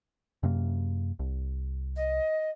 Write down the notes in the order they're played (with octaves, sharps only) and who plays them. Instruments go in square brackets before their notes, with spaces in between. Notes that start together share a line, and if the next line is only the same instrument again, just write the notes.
[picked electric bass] F#2 C3 A#3
C2
[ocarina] D#5